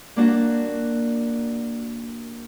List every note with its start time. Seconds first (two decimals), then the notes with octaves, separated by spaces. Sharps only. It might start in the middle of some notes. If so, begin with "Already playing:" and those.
0.16 A#3 D4 F#4